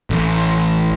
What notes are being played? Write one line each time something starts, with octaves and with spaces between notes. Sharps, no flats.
A1